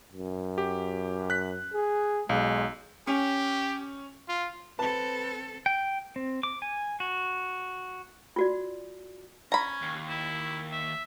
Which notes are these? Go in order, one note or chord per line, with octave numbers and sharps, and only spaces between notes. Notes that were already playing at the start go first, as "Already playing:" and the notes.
F#2
G4
F#6 B6
G#4
B1 G#3
C#4 G4
F4
C4 A4 B4 A5
G5
C4
D6
G#5
F#4
F4 F#4 D5
C#4 A#5 B5
D#2
E4
E5